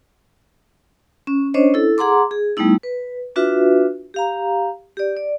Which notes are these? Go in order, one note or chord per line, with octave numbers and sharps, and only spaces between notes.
C#4
C#4 D4 C5 C#5 D#5
E4 A4
G#4 F#5 A#5 C6 D6
G#4
G3 A3 B3 D#4 E4
B4
D4 F4 F#4 B4 E5
G4 F5 A#5
G4 D5
D5